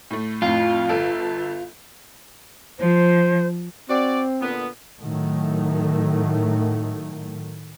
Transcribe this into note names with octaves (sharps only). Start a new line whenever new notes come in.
A2 A3
F2 A2 F4
G1 A4 D7
F3 C5
C4 F#4 D5
A#2 D3 B3
A2 D#3 F#3 A3